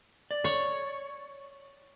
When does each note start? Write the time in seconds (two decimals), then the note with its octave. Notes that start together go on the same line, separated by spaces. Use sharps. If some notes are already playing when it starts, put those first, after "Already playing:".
0.31 D5
0.44 C#5